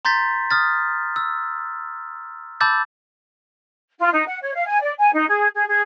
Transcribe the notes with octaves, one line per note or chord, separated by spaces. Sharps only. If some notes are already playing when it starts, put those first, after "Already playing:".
A#5 C6 G6 A6 B6
D#6 F6 A6
E6
A5 B5 D6 E6 G6 A6
F4
D#4
F#5
C#5
F5
G#5
D5
G#5
D#4
G#4
G#4
G#4